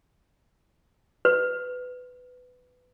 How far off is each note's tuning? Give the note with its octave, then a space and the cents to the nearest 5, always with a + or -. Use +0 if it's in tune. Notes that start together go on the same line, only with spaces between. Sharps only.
B4 +15